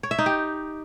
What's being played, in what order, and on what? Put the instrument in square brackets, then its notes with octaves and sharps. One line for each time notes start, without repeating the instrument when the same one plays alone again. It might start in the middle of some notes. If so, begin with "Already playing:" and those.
[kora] C#5
E5
D#4
G4